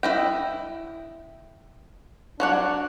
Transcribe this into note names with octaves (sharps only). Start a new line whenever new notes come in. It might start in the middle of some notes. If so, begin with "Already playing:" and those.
E4 D#5 G5
F#3 D4 C#5 F#5